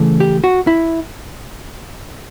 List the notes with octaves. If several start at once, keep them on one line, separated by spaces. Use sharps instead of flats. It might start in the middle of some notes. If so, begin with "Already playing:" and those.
Already playing: C#3 E3 A3
G4
F#4
E4